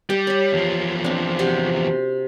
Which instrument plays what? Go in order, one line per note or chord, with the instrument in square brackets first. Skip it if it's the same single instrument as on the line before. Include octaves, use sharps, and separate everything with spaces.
[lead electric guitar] G3 [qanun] G4
[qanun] C#5 B5
[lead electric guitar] E2 F3
[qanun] C4 D4
C3 F4 F#4